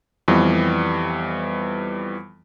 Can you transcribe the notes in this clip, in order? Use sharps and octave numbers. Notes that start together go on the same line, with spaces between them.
F2 E3 G3 B3